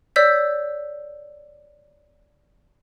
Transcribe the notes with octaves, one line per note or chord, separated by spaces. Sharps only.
C#5 D5 E6 G6 B6